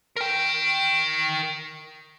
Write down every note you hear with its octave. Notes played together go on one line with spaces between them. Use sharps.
A#4 G5